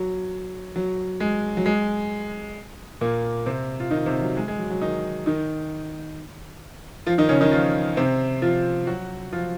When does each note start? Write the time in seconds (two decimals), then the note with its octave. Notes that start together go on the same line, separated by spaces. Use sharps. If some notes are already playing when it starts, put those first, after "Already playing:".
Already playing: F#3
0.76 F#3
1.20 G#3
1.57 F#3
1.66 G#3
3.01 A#2 A#3
3.46 C3 C4
3.80 F4
3.91 D#3 D#4
4.06 C3 C4
4.22 F#3
4.37 G#3
4.48 G#3
4.58 F#3
4.70 F#3
4.81 D#3 D#4
5.26 D#3 D#4
7.06 F3 F4
7.18 D#3 D#4
7.29 C#3 C#4
7.41 D#3 D#4
7.51 F3 F4
7.97 C3 C4
8.42 F3 F4
8.87 F#3 F#4
9.33 F3 F4